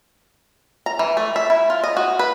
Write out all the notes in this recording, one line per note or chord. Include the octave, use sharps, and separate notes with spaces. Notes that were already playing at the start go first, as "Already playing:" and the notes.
A#5
E3
A3
E5
E4
F4
D#5
F#4
B4